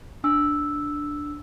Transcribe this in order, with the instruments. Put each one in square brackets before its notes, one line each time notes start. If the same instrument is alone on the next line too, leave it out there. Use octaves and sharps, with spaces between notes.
[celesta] D4 E6